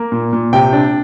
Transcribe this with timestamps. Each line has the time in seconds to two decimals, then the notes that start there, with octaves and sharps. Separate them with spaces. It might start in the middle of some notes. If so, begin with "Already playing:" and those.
Already playing: A#3
0.12 A#2
0.33 A#2
0.53 C3 G5
0.73 D4